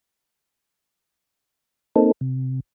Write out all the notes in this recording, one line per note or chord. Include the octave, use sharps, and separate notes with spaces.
A#3 C4 D#4 A4
C3